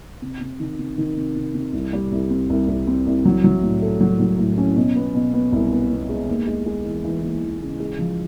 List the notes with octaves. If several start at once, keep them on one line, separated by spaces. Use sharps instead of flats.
C3
C3
D#3
C3
D#3
C3
C3
C3
C2
G3
C2
C4
C2
C2
C4
C2
F#3
F#3
A2
A3
F#3
F#3
A2
C#4
B2
B3
B2
B3
C2
B3
B3
G#3
D#2
G#3
G#3
E3
E3
D#2
E3
C#3
G#3
F3